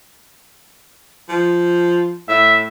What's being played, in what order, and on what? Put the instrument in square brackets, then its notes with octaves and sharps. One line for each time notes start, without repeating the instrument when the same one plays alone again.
[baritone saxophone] F3
[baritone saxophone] A2 [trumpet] E5